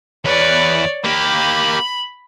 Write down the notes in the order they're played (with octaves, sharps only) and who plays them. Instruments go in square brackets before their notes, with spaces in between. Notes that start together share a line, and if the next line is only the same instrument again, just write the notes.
[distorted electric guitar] E2 B4 [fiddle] C#5 D5
[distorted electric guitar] A#3 G4 [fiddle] B5